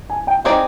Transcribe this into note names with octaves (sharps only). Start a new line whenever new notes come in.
G#5
G5
C4 D#4 G#4 D5 D#5